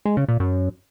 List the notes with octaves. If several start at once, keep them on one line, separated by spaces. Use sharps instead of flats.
G#3
C#3
A#2
F#2